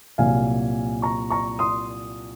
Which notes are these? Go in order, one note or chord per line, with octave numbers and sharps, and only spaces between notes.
C2 A#2 F#3 F5 G#5
A#5 C#6
A#5 C#6
C6 D#6